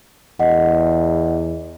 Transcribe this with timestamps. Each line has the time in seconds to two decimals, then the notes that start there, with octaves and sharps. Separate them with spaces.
0.40 E2 D#5 F#5